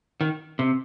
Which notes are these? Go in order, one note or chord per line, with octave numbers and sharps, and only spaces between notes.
D#3
C3